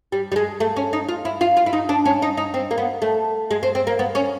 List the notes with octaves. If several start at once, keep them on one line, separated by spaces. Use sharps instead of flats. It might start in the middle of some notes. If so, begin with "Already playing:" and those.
G3
G3
G#3
A3
C#4
D#4
F4
E4
F4
F4
E4
D#4
D4
C#4
D#4
D#4
C4
A#3
B3
A3
G#3
C4
C4
A#3
B3
C#4